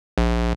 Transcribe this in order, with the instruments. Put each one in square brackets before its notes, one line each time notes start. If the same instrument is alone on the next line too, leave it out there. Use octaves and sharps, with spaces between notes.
[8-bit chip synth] A#1